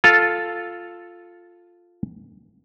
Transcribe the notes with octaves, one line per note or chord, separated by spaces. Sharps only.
F4 A4 F5